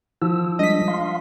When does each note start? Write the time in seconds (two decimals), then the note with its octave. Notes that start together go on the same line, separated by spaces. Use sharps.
0.22 F3 E6
0.59 G3 G#3 D4 D#5 B6
0.88 F5 C6